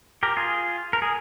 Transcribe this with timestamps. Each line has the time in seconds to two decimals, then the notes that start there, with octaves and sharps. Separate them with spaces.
0.23 G4 A#4
0.37 F4 G#4
0.93 A#4
1.02 G#4